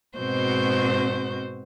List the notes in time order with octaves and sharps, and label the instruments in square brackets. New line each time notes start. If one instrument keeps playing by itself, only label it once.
[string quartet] G#2 B2 C4 F#4 C5 G6